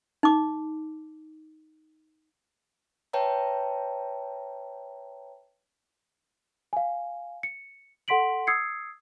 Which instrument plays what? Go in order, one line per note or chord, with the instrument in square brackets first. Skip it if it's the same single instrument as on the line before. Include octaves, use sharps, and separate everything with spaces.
[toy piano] D#4 D6
[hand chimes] B4 C#5 E5 G5 A5 A#5
[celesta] F5 G#5
C#7
A4 F#5 C6 B6 D7 F#7
D#6 E6 G#6 C7 C#7